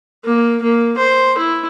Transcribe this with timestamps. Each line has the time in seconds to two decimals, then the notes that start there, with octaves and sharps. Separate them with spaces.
0.25 A#3
0.63 A#3
0.97 C5
1.38 E4